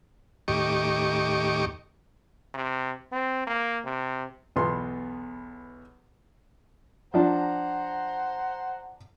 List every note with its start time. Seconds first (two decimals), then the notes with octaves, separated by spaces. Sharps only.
0.48 D#2 A2 G4 D#5 C#6 D6
2.54 C3
3.12 C4
3.47 A#3
3.84 C3
4.56 B1 E2 B3 C6
7.14 F3 D4 C5 F#5 A#5